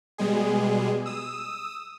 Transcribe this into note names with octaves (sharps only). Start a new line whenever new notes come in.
B2 G3 G#3 G#4
D#6 E6